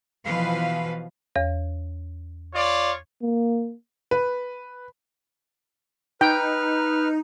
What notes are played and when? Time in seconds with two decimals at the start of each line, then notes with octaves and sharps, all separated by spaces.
0.25 B2 E3 F3 B4 F5
1.36 E2 C#5
2.55 F4 C#5 D5
3.23 A#3
4.11 B4
6.21 D#4 B4 G5 F6